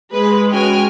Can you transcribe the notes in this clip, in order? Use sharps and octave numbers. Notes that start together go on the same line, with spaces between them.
G#3 B4
C#4 F#4 G5 G#5 F6